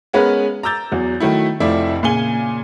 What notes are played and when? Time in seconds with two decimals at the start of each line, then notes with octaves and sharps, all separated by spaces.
0.13 G#3 B3 C#4 G#4 A#4 B4
0.63 A#5 D6 E6 G6 A6
0.92 E2 F#3
1.20 D#3 F#3 A3 E4
1.60 F1 F3 A3 E4 D5 E5
2.03 A#2 C#3 G#5 G7